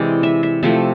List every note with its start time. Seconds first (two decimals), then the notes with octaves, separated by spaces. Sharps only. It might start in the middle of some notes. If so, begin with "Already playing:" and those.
Already playing: C3 E3 G#3 D5
0.23 E5
0.43 E5
0.63 C3 F3 A3 E5